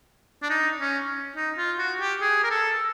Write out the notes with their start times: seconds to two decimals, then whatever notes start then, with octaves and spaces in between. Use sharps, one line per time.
0.43 D4
0.50 D#4
0.79 C#4
1.36 D#4
1.58 F4
1.79 F#4
2.00 G4
2.21 G#4
2.44 A#4
2.51 A4